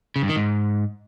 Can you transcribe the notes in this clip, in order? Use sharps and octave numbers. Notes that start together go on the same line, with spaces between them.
C#3
G2
D#3
G#2